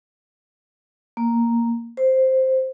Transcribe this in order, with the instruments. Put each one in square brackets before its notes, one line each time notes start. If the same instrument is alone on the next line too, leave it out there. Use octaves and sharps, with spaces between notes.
[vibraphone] A#3
C5